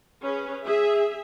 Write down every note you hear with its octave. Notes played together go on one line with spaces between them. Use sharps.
C#4 G#4 B4
G#4 E5